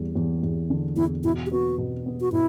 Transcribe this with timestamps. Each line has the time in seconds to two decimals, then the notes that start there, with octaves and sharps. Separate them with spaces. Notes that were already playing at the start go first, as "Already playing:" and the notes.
Already playing: E2 G3
0.15 E2
0.43 E2
0.70 D3
0.96 E2 E4
1.24 B2 E4
1.46 G4
1.51 B3 F#4
1.78 B2
2.06 B3
2.21 F#4
2.32 B2 E4